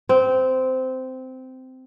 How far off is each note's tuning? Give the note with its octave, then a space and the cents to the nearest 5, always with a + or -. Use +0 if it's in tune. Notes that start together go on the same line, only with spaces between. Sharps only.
C4 -15